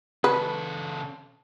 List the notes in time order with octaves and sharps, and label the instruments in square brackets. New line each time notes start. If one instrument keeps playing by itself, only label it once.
[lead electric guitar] C#3 A4 [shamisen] B4